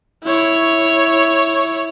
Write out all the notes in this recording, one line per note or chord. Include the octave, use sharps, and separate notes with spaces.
E4 C#5